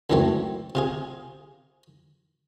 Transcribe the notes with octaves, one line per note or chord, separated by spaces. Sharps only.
C#2 F#2 E3 F#3 A3 C4
C3 F4 G#4